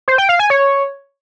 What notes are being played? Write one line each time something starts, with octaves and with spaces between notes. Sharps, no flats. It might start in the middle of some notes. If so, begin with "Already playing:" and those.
C5
G5
F5
G#5
C#5